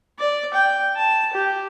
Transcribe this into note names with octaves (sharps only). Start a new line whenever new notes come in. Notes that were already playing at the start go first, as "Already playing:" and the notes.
D5
G5
A5
G4